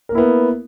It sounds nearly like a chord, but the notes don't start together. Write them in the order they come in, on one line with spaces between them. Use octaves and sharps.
A#4 A#3 E4 B3